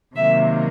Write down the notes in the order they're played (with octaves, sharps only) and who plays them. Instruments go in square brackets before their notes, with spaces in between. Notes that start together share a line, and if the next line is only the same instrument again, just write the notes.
[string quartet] C3 D#3 F#3 A#3 E5